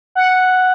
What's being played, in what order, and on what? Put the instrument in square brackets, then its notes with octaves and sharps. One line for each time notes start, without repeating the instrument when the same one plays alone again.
[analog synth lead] F#5